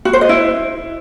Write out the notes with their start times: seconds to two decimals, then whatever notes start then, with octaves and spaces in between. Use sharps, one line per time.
0.05 F#4
0.13 C5
0.21 D#5
0.29 E4